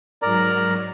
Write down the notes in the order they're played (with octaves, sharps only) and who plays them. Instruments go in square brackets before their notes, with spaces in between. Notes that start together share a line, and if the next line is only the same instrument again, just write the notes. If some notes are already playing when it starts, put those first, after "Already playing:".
[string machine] G#2 F#3 [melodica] A#4 D5 A#5